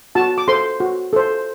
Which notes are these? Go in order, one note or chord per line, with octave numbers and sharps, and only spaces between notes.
F#4 A5
D6
A4 C5 C6
F#4
A4 C5